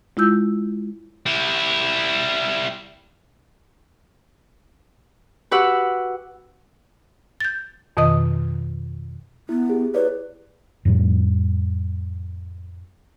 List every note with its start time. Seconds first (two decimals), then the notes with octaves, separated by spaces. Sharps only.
0.17 G#3 E4 F4 E6 G6
1.26 G3 E4
5.51 F#4 G4 B4 F#5 E6
7.40 G6 A6
7.97 F2 B2 D#3 D#5 D#6
9.49 B3 E4
9.70 G4 G#4
9.95 E4 B4 C#5 D5
10.85 F2 A2 G3